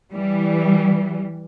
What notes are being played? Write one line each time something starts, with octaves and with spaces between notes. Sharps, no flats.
E3 G3